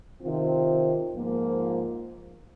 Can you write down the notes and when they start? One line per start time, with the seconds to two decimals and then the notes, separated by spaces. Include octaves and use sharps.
0.22 C3 D#3 C4 F4
1.13 G#2 F3 A#3 F4